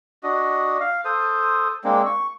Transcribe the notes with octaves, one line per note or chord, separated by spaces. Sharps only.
D4 F#4 D#5
F5
A4 C5 D#6
G#3 A#3 C4 D4
C#6